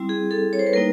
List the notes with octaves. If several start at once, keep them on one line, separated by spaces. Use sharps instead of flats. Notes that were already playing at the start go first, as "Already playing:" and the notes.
Already playing: G3 C4 E4
G#4
A4
C#5
C5
B4
G3 A#3 D#4 A#4